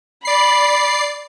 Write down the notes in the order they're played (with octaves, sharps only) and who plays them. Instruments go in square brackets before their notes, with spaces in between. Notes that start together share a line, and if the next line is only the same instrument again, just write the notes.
[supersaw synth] D5 C7 [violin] B5